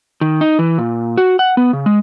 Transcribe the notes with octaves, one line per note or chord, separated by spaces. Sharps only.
D#3
D#4
E3
A#2
F#4
F#5
B3
C#3
G#3